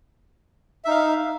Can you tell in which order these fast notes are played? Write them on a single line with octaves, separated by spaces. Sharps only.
E5 D#4 F5